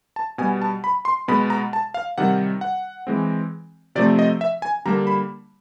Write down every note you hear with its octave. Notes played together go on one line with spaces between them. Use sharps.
A5
B2 G3 B3 G#5
A5
B5
C6
B2 G#3 B3 B5
A#5
A5
F5
C3 D#3 G3 F#5
F#5
E3 G#3 C4
C3 F3 A3 C4 D5
D#5
E5
G#5
D3 G3 A#3 A#5
B5